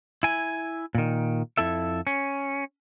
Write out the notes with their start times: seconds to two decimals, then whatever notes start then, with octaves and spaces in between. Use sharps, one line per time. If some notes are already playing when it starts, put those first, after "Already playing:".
0.23 E4 G#5
0.95 A#2 D#3
1.57 F2 E4 A4 E5
2.07 C#4